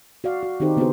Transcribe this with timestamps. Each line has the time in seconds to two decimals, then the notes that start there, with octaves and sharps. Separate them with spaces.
0.24 F#4 D5 F5
0.43 F#4
0.60 D#3 C4 D#4 G4 A4 C5
0.77 C#3 B3 D4 F#4 G#4 C5